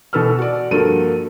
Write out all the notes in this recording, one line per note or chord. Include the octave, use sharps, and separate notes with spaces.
B2 E3 A4 B4 E6 F6
F#4 D5
G2 F3 A#3 F#4 A4 D#7